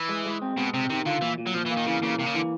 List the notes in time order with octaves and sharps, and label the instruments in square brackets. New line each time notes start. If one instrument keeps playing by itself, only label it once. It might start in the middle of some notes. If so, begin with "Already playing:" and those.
Already playing: [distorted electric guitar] E3
[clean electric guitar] G#3
G#3
C4
[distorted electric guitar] B2 [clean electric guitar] G#3
[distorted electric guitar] C3 [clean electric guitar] C4
[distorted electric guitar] C3 [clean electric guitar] D#3
[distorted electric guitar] D3 [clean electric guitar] F4
[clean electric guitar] A#2 [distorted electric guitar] E3
[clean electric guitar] A#2
[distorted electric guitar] F#3
[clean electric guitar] A#2 [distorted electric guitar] F3
[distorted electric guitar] E3
[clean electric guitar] A#3
[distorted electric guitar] D#3
[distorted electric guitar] C#3 [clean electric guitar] E3
[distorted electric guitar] C#3 [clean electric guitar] A#3
[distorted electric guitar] C3 [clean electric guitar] A#3
[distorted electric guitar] C#3
[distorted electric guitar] D3 [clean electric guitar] E3